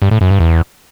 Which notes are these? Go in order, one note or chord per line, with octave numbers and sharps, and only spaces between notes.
G2
A2
F#2
G2
E2